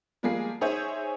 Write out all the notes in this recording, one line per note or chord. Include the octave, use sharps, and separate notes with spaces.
F3 G3 G#3 A#3 G#4 C7
D#4 G#4 C5 C#5 E5 G#5